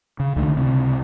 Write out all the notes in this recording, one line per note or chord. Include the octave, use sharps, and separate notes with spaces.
C#3
C#2 D3 D#3 A3
C#2 C3